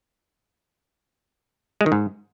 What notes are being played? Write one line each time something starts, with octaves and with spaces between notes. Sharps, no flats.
G#3
D#3
G#2